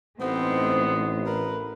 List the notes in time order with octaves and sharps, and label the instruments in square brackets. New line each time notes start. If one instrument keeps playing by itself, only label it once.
[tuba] A1 [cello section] A3 D#4 C5 [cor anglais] B3 [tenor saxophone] C4
[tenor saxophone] A#4 [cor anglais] B4